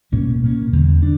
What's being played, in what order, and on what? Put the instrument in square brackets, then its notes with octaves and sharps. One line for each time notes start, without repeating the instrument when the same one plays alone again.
[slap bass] B2 G3 A#3 C#4
B2 A#3 C#4
E2 D3 G3
D4